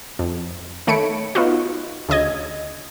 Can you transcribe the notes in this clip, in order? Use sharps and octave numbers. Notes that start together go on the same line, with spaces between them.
F2
D#3 A3 C#5 B5 C#7 D7
B3 D#4 F4 F#4
D2 C#3 D#5 G#6